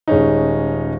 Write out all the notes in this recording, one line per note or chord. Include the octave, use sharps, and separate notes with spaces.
D#1 G#3 C#4 D#4